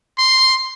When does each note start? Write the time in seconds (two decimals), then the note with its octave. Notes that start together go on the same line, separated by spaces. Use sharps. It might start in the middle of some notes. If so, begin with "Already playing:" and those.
0.18 C6